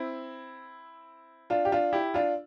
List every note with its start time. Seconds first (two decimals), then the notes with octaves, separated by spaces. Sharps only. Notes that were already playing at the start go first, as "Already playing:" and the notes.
Already playing: C4 E4
1.50 D4 F4
1.65 G4
1.72 D4 F4
1.93 E4 G4
2.14 D4 F4